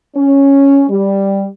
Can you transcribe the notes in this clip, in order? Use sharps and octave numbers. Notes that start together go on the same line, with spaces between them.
C#4
G3